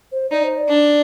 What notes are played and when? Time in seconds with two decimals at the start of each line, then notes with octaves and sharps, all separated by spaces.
0.12 C5
0.31 D#4 D5
0.44 C5
0.58 D5
0.69 D4